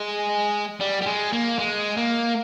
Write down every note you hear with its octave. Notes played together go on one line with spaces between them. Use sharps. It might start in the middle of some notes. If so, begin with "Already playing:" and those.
Already playing: G#3
G3
G3
G#3
A#3
G#3
A#3